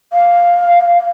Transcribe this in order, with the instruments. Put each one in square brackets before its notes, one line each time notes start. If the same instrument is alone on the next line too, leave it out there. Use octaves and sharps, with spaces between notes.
[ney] F5